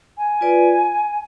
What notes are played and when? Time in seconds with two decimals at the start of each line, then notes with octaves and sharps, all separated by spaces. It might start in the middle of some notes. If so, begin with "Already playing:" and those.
0.17 G#5
0.41 F4 B4 D5